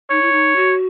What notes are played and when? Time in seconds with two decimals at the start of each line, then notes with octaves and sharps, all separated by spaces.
0.10 D#4 C#5
0.22 E4
0.32 D#4
0.56 F#4